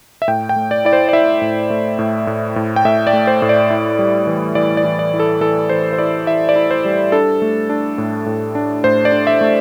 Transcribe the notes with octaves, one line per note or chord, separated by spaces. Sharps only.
E5
A2 G5
G5
A3
D5
E4 D5
C5
D5
E4 E5
A2
A3
A2
A2
A2
G5
A2 E5
D5
A3
C5
A2
D5
E4
G3
E3
E3 D5
D5
E3
D5
E4
A4
E3 A4
E3 C5
C5
E4 D5
E4 E5
D5
E4
C5
G3
D4 A4
A3
D4
A2
A2
D4
A2 C5
D5
D4
E5
A3